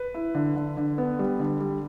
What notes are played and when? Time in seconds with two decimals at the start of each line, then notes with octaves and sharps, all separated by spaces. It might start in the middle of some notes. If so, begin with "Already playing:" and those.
Already playing: B4
0.14 E4
0.35 D3
0.56 D3
0.77 D3
0.98 B3
1.19 G3
1.40 D3
1.60 G3